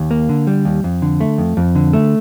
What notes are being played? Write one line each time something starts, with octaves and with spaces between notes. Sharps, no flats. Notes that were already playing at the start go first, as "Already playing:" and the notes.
Already playing: D#2
A#3
D3
G3
D#2
F2
D3
A3
F2
F2
D3
A3